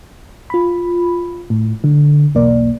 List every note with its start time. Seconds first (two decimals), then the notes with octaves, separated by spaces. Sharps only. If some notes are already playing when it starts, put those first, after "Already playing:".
0.50 F4 B5
1.50 A2
1.84 D3
2.35 B1 E2 A#3 D5